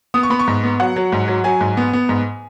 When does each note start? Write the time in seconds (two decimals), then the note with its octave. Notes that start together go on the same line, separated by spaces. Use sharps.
0.14 B3 D#6
0.23 C#6
0.30 B3 B5
0.39 C#6
0.48 G#2
0.64 B3
0.80 F#3 F#5
0.96 F#3
1.12 G#2
1.28 F#3
1.44 F#3 G#5
1.61 G#2
1.77 B3
1.93 B3
2.09 G#2